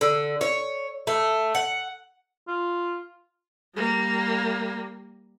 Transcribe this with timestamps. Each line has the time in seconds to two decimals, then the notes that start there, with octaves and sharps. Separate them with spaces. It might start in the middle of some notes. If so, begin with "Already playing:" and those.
0.01 D3
0.41 C#5
1.07 A3
1.55 F#5
2.48 F4
3.75 G3 A#3